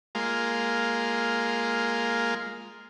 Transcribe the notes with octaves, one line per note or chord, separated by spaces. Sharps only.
G#3 A#3 F4